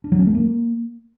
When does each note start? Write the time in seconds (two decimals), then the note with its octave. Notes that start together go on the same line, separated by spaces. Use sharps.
0.04 D4
0.12 F#3
0.19 C#4
0.27 A3
0.35 A#3